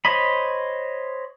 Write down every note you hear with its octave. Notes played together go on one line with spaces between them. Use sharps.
C5 C#5 D#5 B5